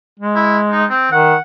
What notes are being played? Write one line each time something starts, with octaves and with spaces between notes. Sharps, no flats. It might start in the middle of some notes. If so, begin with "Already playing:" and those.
G#3
E4
D#4
C4
D#3 F#5